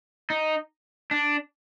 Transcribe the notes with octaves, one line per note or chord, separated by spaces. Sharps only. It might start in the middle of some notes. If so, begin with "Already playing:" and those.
D#4
D4